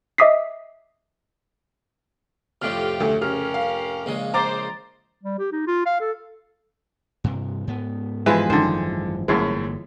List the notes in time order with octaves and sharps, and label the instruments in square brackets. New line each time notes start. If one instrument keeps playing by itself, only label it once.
[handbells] D#5 E5 D6 D#6 B6 C7
[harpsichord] F2 A2 C3 [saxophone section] F4 G4 [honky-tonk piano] F6
[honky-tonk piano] D2 A3
[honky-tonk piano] C#3 F6 [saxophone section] C#4 G4 A#4
[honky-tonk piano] F5
[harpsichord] A#1 C#3 G#3
[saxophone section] C5 [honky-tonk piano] A#5 D6 A6
[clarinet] G3
G4
D#4
F4
F5
A4
[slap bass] G2 C3
G#2 B3
[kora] E3 F3 G#3 [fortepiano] E4 B4
[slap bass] G#1 F#2 F3 [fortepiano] D3 D#3 [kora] C5
[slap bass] G1 A#3 [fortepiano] F#2 A2 G#3